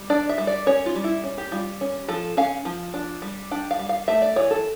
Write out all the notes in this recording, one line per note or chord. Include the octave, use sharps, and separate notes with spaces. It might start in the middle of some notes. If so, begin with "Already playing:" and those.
Already playing: G3
D4 D5
E5
G3
D5
C#4 C#5
F4
G3
E4
C#4
G4
G3 F4
C#4
F3 A4
C#4 F5
F3
D4
G3
D4 G5
F5
G3
F5
A3 E5
D5
E3 C#5
A4